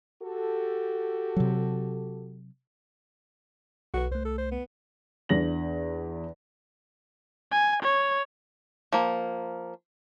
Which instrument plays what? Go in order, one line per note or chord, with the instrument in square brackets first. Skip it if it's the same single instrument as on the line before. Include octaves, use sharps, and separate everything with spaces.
[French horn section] F#4 G4 A4
[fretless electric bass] C3 F#3
[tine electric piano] B1 B4 [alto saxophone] F#4
[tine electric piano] C2 A3 [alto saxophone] C5
[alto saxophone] A4
C5
B3
[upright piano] E2 D4 A#6 F#7
[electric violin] G#5
C#5
[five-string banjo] F3 A#3